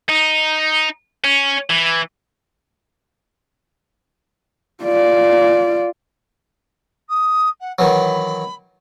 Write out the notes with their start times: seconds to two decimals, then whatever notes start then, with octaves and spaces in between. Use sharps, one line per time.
0.09 D#4
1.24 C#4
1.70 E3
4.84 F4 D5
7.09 D#6
7.60 F#5
7.79 D#3 E3 F#3 B5